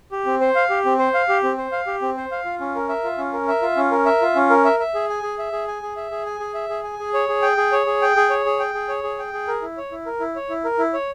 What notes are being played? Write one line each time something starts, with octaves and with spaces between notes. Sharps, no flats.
G4
C4
C5
F5
G4
C4
C5
F5
G4
C4
C5
F5
G4
C4
C5
F5
F4
C#4
A#4
E5
F4
C#4
A#4
E5
F4
C#4
A#4
E5
F4
C#4
A#4
E5
E5
G#4
G#5
G#4
E5
G#4
G#5
G#4
E5
G#4
G#5
G#4
E5
G#4
G#5
G#4
C#5
G#4
G5
G#4
C#5
G#4
G5
G#4
C#5
G#4
G5
G#4
C#5
G#4
G5
G#4
A#4
E4
C#5
E4
A#4
E4
C#5
E4
A#4
E4
C#5